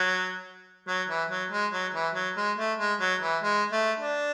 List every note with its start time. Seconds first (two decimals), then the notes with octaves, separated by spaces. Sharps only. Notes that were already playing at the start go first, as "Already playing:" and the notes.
Already playing: F#3
0.87 F#3
1.09 E3
1.30 F#3
1.51 G#3
1.72 F#3
1.94 E3
2.14 F#3
2.37 G#3
2.58 A3
2.79 G#3
3.00 F#3
3.22 E3
3.43 G#3
3.72 A3
3.99 D4